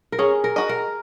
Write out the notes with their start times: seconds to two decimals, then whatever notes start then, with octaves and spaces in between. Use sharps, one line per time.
0.12 A#4
0.19 C#4 G#4
0.44 A#4
0.56 F#4 D#5
0.69 A#4